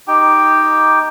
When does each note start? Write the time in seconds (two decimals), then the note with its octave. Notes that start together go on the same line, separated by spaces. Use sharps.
0.08 D#4 G4 G5